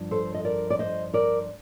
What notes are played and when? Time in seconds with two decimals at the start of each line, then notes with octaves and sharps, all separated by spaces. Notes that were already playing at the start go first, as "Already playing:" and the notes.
Already playing: G2 F3
0.11 A4 C5
0.35 D#5
0.45 A#4 D5
0.70 D5
0.79 C5 D#5
1.14 A#4 D5